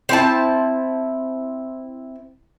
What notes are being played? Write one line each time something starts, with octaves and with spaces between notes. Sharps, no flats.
C4 E4 A5